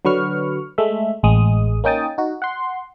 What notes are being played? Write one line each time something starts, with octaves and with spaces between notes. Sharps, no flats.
D3 F#3 B4 C#6 F6
G#3 A3 E5
A1 G#3 D#6
A#3 C#4 D#4 G5 D#6 A6
D#4 F#4
F#5 C6